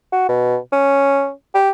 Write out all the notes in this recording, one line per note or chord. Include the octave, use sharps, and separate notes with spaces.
F#4
B2
C#4
G4